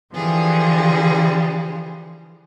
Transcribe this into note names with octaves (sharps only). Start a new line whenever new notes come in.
D3 E3 F3 G3 G#4